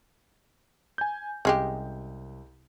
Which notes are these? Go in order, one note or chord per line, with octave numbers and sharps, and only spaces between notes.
G#5 G6
C2 C#3 G#3 G4